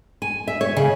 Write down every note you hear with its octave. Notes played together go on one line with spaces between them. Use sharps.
G#5
E5
C#5
C#3